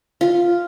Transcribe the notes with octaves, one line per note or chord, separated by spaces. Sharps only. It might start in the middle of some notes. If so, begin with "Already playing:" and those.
F4